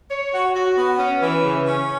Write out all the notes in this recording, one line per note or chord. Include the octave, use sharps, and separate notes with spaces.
C#5
F#4
F#4
B3
C#4
E3
C#3
C#4